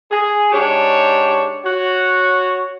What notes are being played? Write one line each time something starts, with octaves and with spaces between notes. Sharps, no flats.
G#4
G#2 D4 G4 C#5
F#4 C#5